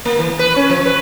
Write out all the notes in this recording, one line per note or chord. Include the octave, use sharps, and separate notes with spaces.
A#3
E3
B4
C#4
F3
B4